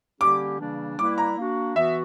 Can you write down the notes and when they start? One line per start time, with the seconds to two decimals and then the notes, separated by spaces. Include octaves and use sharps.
0.21 D3 G3 A#3 C#4 G4 D6
0.60 C#3 E3 G3 A#3 D4
0.98 G3 A#3 E4 B4 D6
1.18 A#5
1.37 A#3 D4 F#4
1.76 E3 B3 F#4 B4 E5